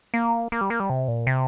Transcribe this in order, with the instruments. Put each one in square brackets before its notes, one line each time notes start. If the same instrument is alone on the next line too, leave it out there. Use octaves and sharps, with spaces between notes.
[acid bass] A#3
A#3
G3
A#3
G3
C3
A#2
C3